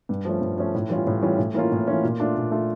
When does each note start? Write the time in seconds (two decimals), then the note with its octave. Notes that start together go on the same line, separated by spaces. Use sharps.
0.09 G2
0.25 F3 A3 C#4
0.41 G2
0.58 F3 A3 C#4
0.75 A2
0.90 E3 G3 C#4 F4
1.07 A2
1.22 E3 G3 C#4 F4
1.38 A2
1.54 E3 A#3 C#4 F4
1.72 A2
1.87 E3 A#3 C#4 F4
2.03 A#2
2.20 A3 D4 F4
2.36 A#2
2.51 A3 D4 F4